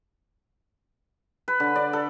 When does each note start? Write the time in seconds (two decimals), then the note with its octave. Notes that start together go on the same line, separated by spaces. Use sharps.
1.48 B4
1.60 D3
1.76 D5
1.93 A4